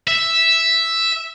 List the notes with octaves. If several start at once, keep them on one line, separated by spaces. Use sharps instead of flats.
E5